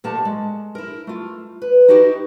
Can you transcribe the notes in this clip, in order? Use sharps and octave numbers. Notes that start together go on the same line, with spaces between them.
A#2 A3 A#3 G4 F#5 A5
G#3
E4 A#4
A3 F4
B4
D#4 E4 F#4 G4 B4 D#5